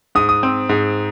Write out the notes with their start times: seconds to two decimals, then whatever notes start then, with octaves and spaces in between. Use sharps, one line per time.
0.15 G#2 D#6
0.29 D#6
0.43 C4
0.69 G#2